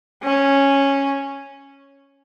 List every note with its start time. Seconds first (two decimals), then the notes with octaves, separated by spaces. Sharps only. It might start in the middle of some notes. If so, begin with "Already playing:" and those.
0.23 C#4